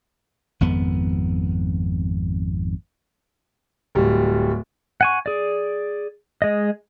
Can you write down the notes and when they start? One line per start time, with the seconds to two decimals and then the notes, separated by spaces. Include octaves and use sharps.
0.61 G#1 F2 B3
3.95 D1 G3
5.01 F#5 G#5 C#6
5.26 G#4 D5
6.42 G#3 D#5